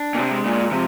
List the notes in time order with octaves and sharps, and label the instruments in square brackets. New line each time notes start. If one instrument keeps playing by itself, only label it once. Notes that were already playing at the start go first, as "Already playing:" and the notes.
Already playing: [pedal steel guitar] D4
[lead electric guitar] A#2
C3
[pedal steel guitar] G#3
[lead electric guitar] A#2
[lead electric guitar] C3 [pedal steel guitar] F3